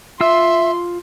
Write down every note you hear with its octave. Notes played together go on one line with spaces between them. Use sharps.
F4 E5 C6 E6